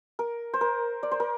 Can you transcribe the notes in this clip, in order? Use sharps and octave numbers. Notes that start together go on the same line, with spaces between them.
A#4
C5
A#4
D5
C5
A#4